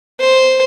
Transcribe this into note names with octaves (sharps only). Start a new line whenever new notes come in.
C5